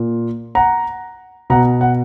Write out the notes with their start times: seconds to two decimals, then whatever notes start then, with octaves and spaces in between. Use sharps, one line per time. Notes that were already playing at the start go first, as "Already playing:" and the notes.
Already playing: A#2
0.55 F#5 A#5
1.50 B2 F#5 A#5
1.81 F#5